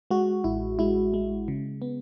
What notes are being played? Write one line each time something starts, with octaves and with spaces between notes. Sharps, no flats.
G#3 F#4
A1 E4
G#3 E4
G#3
C#3
B3